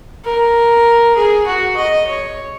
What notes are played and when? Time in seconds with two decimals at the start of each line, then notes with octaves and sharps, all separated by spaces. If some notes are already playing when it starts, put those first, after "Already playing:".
0.25 A#4
1.16 G#4
1.47 F#4
1.77 D#5
2.07 C#5